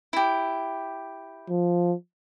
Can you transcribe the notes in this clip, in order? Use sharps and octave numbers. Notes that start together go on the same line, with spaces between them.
E4 G4
F3